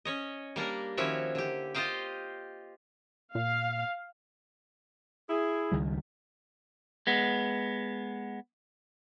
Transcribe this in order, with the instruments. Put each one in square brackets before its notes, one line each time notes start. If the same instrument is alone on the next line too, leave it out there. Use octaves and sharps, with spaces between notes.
[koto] C#4 C#5 D#5
G3 A#3 D4 A#4
D#3 F3 C#4 E4 F#4 C#5
D3 G4
F4 G4 C5 D#5 F5 G5
[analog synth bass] A#2 [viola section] F5
[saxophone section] E4 G#4
[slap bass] C#2 D#3 G3
[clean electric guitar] G#3 B3